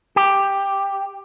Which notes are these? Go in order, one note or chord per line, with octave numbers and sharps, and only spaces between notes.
G4